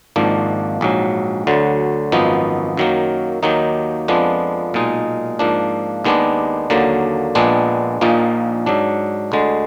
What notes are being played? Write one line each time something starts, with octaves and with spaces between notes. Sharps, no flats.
G#1 G#2 F3 A#3 D4
A#1 G#2 F#3
D2 D3 F#3
G#1 F#2 F3 B3 D#4
F#2 D#3 F#3 A#3
D#2 D#3 F#3 A#3 D#4
F2 F3 G#3 B3 D4
B1 A#2 G#3 D#4
G#2 F3 A#3 D4
D#2 D#3 G#3 B3 D4
D#2 D3 F#3 A#3
A#1 A#2 G#3 B3 D4
A#1 A#2 F3 A#3 D#4
G#2 F#3 D4
D2 D3 G#3